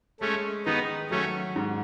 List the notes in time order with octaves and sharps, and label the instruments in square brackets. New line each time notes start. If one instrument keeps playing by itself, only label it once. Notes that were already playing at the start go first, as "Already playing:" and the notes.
[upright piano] G#3 [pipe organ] A3 C#4
[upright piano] D#3 [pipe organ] B3 D#4
[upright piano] F#3 [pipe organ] A3 C#4
[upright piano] G#2